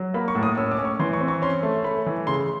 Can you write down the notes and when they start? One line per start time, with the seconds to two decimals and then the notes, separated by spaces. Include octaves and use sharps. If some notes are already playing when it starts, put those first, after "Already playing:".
Already playing: F#3
0.14 A#3 B5
0.28 C#6
0.35 A2
0.43 D#6
0.57 C#4 E6
0.71 D6
0.79 C#4
0.85 C#6
1.00 E3 C6
1.13 C#6
1.21 C4
1.28 C#6
1.42 C#4 C6
1.63 A3
1.84 A3 B5
2.06 E3
2.27 C#3 C6